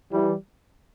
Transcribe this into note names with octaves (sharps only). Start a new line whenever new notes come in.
E3 G3